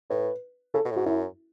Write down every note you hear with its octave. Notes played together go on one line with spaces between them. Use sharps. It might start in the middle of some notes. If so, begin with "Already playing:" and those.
A2 B4
C#3 A4
B2
A2
G#2 F#4
F#2 E4